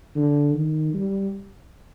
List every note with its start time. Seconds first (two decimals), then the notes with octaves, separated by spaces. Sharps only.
0.15 D3
0.54 D#3
0.94 G3